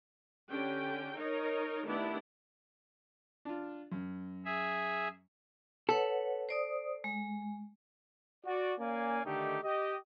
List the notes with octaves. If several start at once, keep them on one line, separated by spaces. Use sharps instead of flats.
D3 C#4 G4 G5
D#4 A#4 C#5 D#5
D#3 A3 B3 D4 E4 G4
D4 F4
F#2
G#4 E5
A4 B4 C#5 F#5
C5 D5 D#6
G#3
F#4 D5
A#3 C#4 D5 F5 G#5
D3 D#3 A3 D#4 G4
G4 D#5